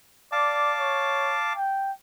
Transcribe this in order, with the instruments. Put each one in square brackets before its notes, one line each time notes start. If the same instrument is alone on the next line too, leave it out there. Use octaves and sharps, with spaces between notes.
[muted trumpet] D5 [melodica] F5 A5 D6
[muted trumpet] C#5
G5